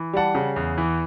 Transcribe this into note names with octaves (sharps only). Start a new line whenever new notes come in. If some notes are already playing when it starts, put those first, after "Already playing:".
Already playing: E3
G3 F#5 A5
C#3
E2
E3